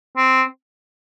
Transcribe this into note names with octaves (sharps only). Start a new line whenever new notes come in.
C4